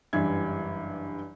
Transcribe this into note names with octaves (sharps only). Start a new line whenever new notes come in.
F#1 G2 E3 G3 E5 G#6